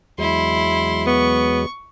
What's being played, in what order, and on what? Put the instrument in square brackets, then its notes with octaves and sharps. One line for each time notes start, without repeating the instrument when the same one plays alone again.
[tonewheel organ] E2 F#3 G#3 [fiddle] E4 C6
[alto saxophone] B3 [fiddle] C#6